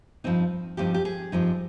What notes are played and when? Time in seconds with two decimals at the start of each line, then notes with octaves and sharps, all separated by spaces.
0.24 G2 F3 C4 D#4
0.77 G2 F3 C4 D#4 G4
0.94 G4
1.05 G#4
1.32 G2 F3 C4 D#4